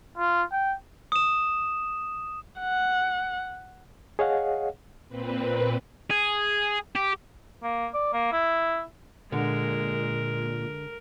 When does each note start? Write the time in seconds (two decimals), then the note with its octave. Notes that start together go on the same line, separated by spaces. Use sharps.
0.18 F4
0.52 G5
1.12 D#6 E7
2.60 F#5
4.19 G#4 C#5 D#5 F5 F#5
5.08 A#2 C4 B4
6.10 G#4
6.96 G4
7.63 A#3
7.94 D5
8.13 A#3
8.32 E4
9.32 A#2 D3 G#3 A#4